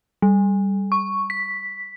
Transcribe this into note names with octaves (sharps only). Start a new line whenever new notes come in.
G3
C#6
B6